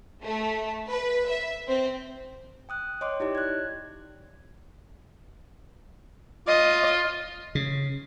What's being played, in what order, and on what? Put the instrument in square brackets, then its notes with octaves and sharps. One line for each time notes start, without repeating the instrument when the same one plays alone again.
[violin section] A3
B4
E5
C4
[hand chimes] G5 D#6 F#6
C#5 D#5 G5 C6 D6
D#4 E4 G4 C#5 D5
F#6 G#6
[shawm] F4 [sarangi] D#5
[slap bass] C#3